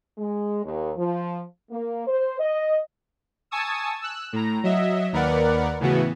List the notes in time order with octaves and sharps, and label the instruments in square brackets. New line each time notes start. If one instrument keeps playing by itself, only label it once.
[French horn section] G#3
D#2
F3
A#3
C5
D#5
[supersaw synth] G#5 A5 C#6 D#6 E6
E6 F#6
A2 A#5
F#3 D#5 E5
D#2 A#4 B4 D5 F#5
A2 C#3 E3 B3 F#4